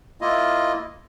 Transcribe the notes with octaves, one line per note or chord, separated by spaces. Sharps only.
A#3 E4 F4 D#5